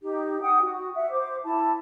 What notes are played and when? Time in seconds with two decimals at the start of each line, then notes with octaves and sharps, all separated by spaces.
0.01 D#4 G4
0.42 F#5 G5 D#6
0.61 F#4
0.95 E5 F#5
1.11 C5 D6
1.44 E4 A5